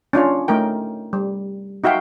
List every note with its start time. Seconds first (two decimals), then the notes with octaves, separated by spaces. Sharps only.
0.13 C#4 D4 F4 C#5
0.48 A3 D#4 A#4 G5
1.13 G3
1.84 D#4 F#4 E5 F5 G5